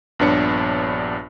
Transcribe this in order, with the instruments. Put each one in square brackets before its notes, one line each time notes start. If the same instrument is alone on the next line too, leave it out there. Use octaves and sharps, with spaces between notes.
[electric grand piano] A#1 G2 B3 D4 C#5 C#7